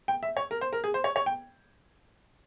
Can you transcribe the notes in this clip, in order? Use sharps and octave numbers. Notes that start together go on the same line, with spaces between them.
G5
E5
C#5
A#4
C5
A#4
G#4
C5
C#5
C#5
G5